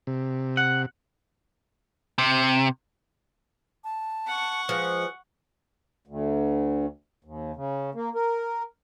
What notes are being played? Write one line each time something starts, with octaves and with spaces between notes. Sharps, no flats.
C3
F#5
C3
A5
F#5 C#6
F3 G#3 B4
D2
D#2
C#3
A#3
A#4